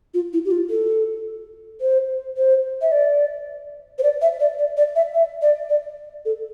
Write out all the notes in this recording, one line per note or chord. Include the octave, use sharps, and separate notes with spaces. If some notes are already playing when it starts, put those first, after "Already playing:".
F4
E4
G4
F4
A4
C5
C5
E5
D5
C5
D5
E5
D5
D5
D5
E5
E5
D5
D5
A4